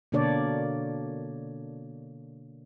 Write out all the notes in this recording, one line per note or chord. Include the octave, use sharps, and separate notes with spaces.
B2 D3 A#3 D4 C#5 D5